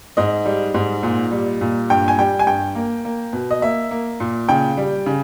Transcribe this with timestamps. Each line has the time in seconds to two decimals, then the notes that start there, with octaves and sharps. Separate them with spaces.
0.17 G#2 D#5
0.45 G3
0.74 G#2
1.03 A#2
1.32 G3
1.61 A#2
1.90 G2 G5
2.08 G#5
2.18 G3 G5
2.39 G#5
2.47 G2 G5
2.75 A#3
3.05 A#3
3.33 B2
3.51 D#5
3.62 A#3 E5
3.91 A#3
4.20 A#2
4.49 C#3 G5
4.77 G3
5.06 C#3